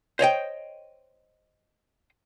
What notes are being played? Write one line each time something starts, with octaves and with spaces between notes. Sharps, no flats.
C5 C#5 D#5 G5